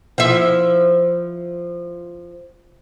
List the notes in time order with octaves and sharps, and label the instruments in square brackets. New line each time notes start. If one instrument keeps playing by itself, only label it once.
[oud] F3 E4